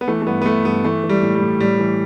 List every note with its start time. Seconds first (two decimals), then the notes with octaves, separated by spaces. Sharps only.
0.01 B3
0.08 E3 A3
0.22 A3
0.27 G2 B3
0.42 B3
0.46 G2 A3
0.65 G2 B3
0.84 E3 A3
1.04 E3
1.09 G3
1.23 A2
1.35 G3
1.42 A2
1.60 A2 G3
1.80 E3